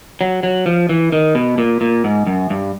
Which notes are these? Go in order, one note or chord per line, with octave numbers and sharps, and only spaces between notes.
F#3
F#3
F3
E3
D#3
B2
A#2
A#2
G#2
F#2
G2